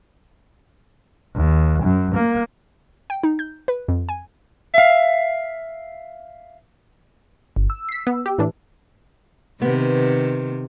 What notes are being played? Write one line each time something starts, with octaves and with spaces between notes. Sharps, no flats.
D#2
F#2
A#3
G5
D#4
G6
B4
F2
G#5
E5 F5
G1
E6
B6 C7
B3
G4
A2 E3 D4
C3 D#3 B3